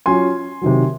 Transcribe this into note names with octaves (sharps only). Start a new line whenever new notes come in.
F#3 C#4 F4 G#5 C6
C3 D#3 F#3